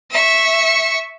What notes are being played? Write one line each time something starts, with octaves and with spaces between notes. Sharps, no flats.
E5 C#6